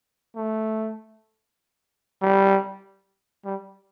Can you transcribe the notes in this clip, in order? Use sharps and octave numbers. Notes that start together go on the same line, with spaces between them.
A3
G3
G3